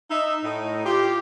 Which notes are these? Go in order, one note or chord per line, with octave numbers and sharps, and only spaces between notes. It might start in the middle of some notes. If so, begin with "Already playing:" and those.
D#4 E5
A2 D#4
F4 G4